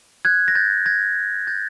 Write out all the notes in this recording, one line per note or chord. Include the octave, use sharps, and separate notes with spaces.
F#6 G#6
A#6
G6 A6
G#6 A#6
G6 A6